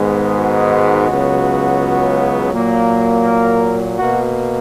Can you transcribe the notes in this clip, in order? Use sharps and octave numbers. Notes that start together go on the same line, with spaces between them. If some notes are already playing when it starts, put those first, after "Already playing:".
Already playing: G#2 D#3 G#3 B3
F#4
C#2 C#3 F#3 B3
A#2 F#3 A#3
A#4
B2 A#3 F#4